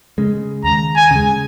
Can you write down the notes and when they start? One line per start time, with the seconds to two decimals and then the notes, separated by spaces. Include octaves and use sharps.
0.18 C#3 G#3
0.64 D#2 A#5
0.96 G#5
1.11 C#3 G#3